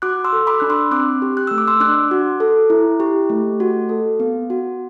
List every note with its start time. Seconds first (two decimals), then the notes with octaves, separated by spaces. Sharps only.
0.02 F#4 D6 F#6
0.25 C6 E6
0.33 A4
0.47 B5 D6
0.60 D4 F#6
0.70 C6 E6
0.91 C4 D6 F#6
1.22 G4
1.37 F#6
1.47 A3 E6
1.58 D6
1.68 C6 E6
1.80 D4 D6 F#6
2.11 F#4
2.40 A4
2.70 E4
3.00 G4
3.30 A3
3.60 F#4
3.89 A4
4.20 B3
4.50 F#4